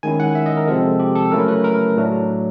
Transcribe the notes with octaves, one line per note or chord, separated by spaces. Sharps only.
D#3 G#3 C#4 E4 G#5
F#5
E5
D#5
A#4
C3 F3 G#3 C4 A4
G4
A4
C#3 F#3 A3 C#4 E4 A#4
B4
A#4
A2 F#3 A3 D4